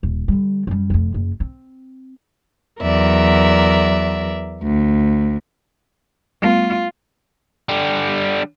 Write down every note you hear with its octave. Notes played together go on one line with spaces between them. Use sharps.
D#1
D3 G3
F#2 G3
F1 F2
F#1
C4
E2 F#3 A#4 D5 E5
D2
G3 A3 B3 F4
D3 G3